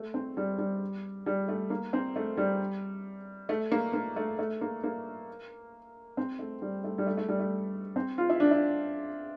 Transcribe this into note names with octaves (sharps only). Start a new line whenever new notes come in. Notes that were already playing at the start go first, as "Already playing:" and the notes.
Already playing: A3
C4
G3
G3
G3
A3
A#3
C4
A3
G3
A3
A#3
A#3
A3
A3
A#3
A#3
C4
A3
G3
A3
G3
A3
A3
G3
A3
C4
F4
E4
D4
E4